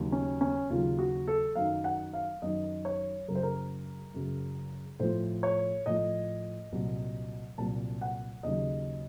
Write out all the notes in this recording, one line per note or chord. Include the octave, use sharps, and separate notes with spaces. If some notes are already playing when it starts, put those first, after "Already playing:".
Already playing: D#2 C#3 F#3
C#4
C#4
D#2 C#3 F#3 F4
F#4
A4
F#2 D#3 F#3 F5
F#5
F5
F#2 D#3 F#3 D#5
C#5
F#2 C#3 F#3 A#4
C5
A#4
F#2 C#3 F#3
A2 F3 C5
C#5
A2 F3 D#5
C2 A#2 F#3
C2 A#2 F#3 A5
F#5
D#2 C#3 F#3 D#5